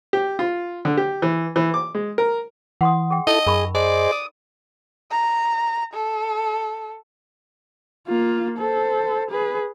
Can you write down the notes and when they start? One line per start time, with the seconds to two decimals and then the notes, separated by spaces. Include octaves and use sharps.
0.13 G4
0.39 F4
0.85 D3
0.97 G4
1.22 E3
1.56 E3
1.74 D6
1.95 G#3
2.18 A#4
2.81 E3 F#5 C6 D#6
3.10 G#4 G5
3.27 D#4 E4 A4 D#5
3.47 F#2 G#4 A#4 B5 C#6
3.75 G#4 C5 D5 D#5
4.12 D#6
5.11 A#5
5.94 A4
8.08 A#3 F4
8.58 A4 C5
9.31 G#4 B4